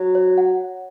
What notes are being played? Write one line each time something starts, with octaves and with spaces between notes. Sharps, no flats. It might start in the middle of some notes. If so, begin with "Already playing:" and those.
Already playing: F#3
C#5
F#5